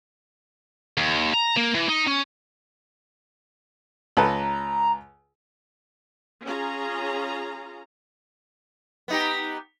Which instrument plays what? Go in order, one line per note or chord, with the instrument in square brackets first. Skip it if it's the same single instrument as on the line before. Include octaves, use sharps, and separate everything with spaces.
[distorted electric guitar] D#2
A#5
A#3
E3
D#4
C#4
[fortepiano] C#2 A4 B4 [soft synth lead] A#5
[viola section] C#4 F4 G#4 A#5
[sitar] B3 D#4 G4